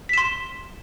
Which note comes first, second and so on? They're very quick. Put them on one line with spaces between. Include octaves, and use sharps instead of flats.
B6 E7 C6